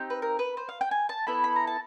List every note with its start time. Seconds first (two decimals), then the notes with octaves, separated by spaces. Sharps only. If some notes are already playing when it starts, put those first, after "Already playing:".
Already playing: C4 D#4 G4
0.10 B4
0.22 A#4
0.39 B4
0.57 C5
0.69 F5
0.81 G5
0.91 G#5
1.09 A5
1.27 B3 E4 A4 B5
1.44 B5
1.56 A#5
1.67 A5